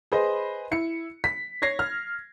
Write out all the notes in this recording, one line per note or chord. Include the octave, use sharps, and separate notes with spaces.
G#4 B4 C5 D#5
E4 C#7
B6
C#5 G#6 A#6 C7
F6